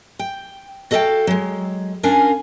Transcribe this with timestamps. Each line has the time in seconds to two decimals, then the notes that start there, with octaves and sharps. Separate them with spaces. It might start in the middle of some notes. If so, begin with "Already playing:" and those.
0.19 G5
0.91 F#4 A4 D5 D#5 F5 G5
1.27 F#3 G#3
2.03 C#4 D4 F4 A#4 F5 G#5